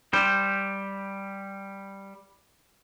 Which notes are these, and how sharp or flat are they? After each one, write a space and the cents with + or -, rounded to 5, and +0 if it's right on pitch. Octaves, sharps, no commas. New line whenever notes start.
G3 +0 C5 +0